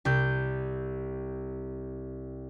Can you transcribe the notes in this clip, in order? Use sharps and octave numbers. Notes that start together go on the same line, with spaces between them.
C2 G6